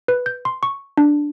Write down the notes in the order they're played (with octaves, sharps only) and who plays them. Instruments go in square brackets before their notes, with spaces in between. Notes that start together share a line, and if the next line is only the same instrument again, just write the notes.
[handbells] B4
G6
C6
C#6
D4